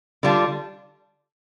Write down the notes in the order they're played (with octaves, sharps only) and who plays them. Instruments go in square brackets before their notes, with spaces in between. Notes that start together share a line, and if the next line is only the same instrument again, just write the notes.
[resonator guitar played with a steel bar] D3 G3 D4 F4